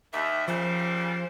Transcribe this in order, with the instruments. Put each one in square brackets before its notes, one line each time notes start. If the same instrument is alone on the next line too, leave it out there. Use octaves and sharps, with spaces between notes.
[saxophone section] D#2 [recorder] E5
[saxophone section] A#2 C#3 G3 [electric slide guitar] F3 [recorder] C5